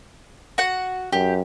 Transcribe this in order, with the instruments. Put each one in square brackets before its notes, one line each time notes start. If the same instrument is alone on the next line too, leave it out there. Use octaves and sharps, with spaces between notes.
[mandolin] F#4 F#5
[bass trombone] F#2 [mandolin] G4